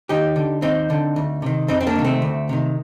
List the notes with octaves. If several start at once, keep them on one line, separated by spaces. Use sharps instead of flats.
D#2 D#4 G4
D3
D#2 C4 D#4
D3
D2
C3 D#3
F2 C4 D#4
C4
A#3 D4
C3 D#3
A3 C4
D2
C3 D#3